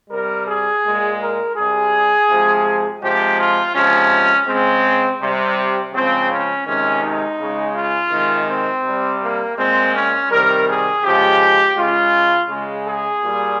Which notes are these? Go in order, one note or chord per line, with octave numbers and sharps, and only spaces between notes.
C3 G3 A#4
G#4
A#2 G#3
A#4
C3 G3 G#4
C3 F3 G#3
C3 F3 G#3 G4
F4
C3 F3 G#3 C#4
C#3 G#3 C4
C3 G3
C#3 F3 G#3 C4
C#4
C3 D#3 G#3 C#4
D#4
C#3 G#3
F4
C3 D#3 G#3
C4
C3 G3
A#3
A#2 G#3 C4
C#4
C3 D#3 G3 A#4
G#4
C#3 F3 G#3 G4
C#3 G#3 F4
C#3 G#3
G#4
A#2 G3